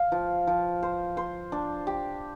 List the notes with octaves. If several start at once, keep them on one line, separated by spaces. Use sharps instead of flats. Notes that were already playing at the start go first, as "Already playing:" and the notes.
Already playing: F5
F3
F3
C5
C5
D4
G4